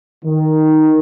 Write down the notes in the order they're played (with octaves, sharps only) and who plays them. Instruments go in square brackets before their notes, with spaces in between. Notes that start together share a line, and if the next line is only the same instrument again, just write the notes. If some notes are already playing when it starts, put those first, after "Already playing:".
[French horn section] D#3